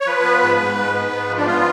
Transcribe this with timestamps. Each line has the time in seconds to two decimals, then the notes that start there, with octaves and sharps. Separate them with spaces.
0.01 C#5
0.07 F3 B4
0.24 B3
0.42 G#2
0.60 G#2
0.77 G#2
0.94 B3
1.12 G#2
1.29 F3
1.37 D4
1.46 B3 F4